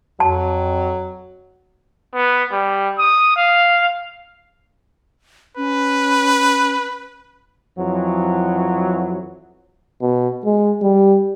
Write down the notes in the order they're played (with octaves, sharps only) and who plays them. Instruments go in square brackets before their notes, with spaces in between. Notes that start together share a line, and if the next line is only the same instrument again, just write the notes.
[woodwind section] F2 [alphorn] F#3 [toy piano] A5
[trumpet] B3
G3
D#6
F5
[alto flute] C#4 [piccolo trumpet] B4
[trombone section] F2 E3 F#3
[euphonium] B2
G#3
G3